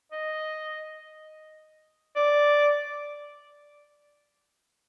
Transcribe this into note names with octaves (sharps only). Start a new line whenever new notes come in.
D#5
D5